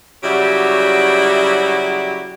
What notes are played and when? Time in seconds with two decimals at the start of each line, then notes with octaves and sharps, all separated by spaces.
0.23 C#3 F#3 G3 E4 F#4 G4